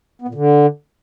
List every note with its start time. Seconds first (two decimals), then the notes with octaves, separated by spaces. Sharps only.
0.22 B3
0.28 A#2
0.35 D3